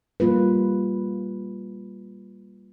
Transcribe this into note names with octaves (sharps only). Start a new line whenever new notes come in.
G3 A#3 F4 B4